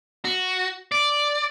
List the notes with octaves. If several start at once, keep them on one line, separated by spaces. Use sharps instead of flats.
F#4
D5